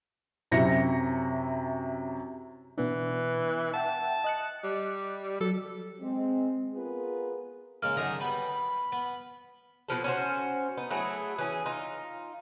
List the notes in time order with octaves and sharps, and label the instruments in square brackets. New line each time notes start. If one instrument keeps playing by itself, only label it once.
[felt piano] F#2 C3 E4 A#6 C#7
[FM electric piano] B2 B3 D4 [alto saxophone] E3
[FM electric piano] E5 F#5 G5 [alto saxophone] A5
[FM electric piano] D#5 F#6 C#7
[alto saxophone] G3
[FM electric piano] F#3 [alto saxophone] A4
[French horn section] G#3 C4
B3 F4 G#4 A#4 B4
[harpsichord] C#3 G#3 A#3 [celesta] F6
[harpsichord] F#2 D3 A#5 [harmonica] D#3 G#4 D#6
[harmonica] G3 B4 G5 [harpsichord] B3
[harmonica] B5
[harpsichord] B3
[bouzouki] B2 F3 A4
C#4 F#4 C5
B3 D#4
F#3 A3 E4 G#4
E3 C#4 G#4
D#4 F4